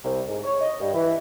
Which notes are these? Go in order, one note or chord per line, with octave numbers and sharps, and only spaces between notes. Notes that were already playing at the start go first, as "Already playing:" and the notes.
C2
G#2
C#5
D#5
G2
E3